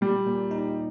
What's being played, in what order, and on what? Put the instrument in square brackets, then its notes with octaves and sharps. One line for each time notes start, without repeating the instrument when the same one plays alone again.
[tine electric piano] A#2 [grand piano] G3
[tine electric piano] A#2
D#4